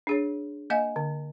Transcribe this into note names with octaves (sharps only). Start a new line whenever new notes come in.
D4 G#4 C#5
A#3 D#5 F5 G#5
D3